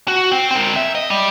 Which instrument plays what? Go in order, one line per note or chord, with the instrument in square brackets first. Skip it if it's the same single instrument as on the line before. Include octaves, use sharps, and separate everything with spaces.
[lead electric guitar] F#4
C4
C4 A#4
E5
D#5
G3